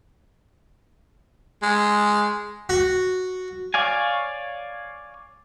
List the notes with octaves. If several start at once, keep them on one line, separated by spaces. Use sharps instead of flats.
G#3
F#4
C#5 D5 F5 G#5